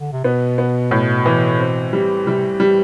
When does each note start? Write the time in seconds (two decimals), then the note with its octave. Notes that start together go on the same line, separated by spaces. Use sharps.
0.01 D3
0.13 C3
0.24 B2 B3
0.58 B3
0.91 A2
1.26 E3
1.59 C4
1.93 G3
2.26 C3 G3
2.60 G3